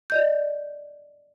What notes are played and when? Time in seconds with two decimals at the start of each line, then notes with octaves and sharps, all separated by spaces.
0.10 D5 D#5 G6